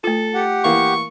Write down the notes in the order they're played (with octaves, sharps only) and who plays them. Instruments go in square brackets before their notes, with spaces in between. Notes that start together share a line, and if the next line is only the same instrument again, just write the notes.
[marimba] A3 F4 [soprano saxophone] A4
[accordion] G4 F#5
[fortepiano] E3 A#3 F5 [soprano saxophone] C#6